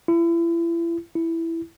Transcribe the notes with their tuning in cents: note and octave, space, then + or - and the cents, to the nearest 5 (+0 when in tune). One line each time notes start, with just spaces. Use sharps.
E4 +35
E4 +5